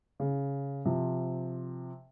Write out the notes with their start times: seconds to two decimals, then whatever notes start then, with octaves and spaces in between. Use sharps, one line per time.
0.20 C#3
0.85 C3 F3